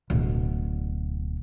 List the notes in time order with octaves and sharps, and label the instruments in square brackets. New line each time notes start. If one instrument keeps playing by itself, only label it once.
[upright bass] D1 B2